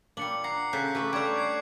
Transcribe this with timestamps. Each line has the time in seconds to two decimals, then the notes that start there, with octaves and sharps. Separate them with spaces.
0.17 A#2 G3 D4 C#7 F#7
0.44 F#5 A#5 C7
0.73 C#3 A4 F#6 G6 B6
0.95 A3 G4 A4 B4 G5
1.13 G3 D4 C#5 F5 A#5 D6 G#6 D7
1.36 G#6 C7 D7